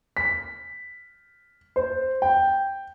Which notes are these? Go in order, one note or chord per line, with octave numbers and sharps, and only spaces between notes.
B6
C5
G5